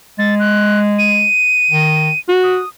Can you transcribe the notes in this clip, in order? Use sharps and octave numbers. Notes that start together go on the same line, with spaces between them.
G#3 A6
F#6
D#7
D#3
F#4
D#6